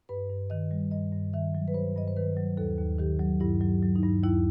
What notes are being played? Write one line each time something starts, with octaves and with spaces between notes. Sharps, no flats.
G2 B4
G2
D#3 D#5
G3
G2 D#5
G2
D#3 E5
F#3
B4
G2 C5
G2 D#5
C5
D#3 B4
F#3
D#2 A4
D#2
D#3 G4
F#3
G2 E4
F#3
F#3
D#4
G2
D#2 E4